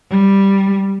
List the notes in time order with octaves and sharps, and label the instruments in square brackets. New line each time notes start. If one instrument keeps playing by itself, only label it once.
[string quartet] G3